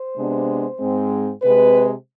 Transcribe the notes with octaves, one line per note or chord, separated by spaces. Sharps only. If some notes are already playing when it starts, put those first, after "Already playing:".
Already playing: C5
C3 G#3 B3 D4
G#2 G#3 C4
C3 G#3 C4 B4